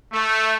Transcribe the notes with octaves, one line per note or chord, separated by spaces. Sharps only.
A3